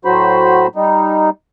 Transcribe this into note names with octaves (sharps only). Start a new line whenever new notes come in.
A2 F#3 F#4 C5 B5
G3 D#4